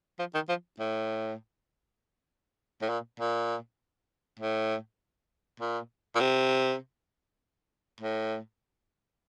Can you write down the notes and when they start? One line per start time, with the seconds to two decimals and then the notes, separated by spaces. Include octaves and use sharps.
0.19 F3
0.34 D#3
0.49 F3
0.79 A2
2.82 A2
2.89 A#2
3.20 A#2
4.39 A2
5.60 A#2
6.15 A#2
6.20 C3
8.01 A2